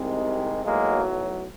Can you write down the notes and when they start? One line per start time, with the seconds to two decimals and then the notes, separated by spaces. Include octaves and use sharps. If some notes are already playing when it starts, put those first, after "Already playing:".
Already playing: C2 C3 D#3 G#3
0.65 B1 A2 F#3 G#3 A#3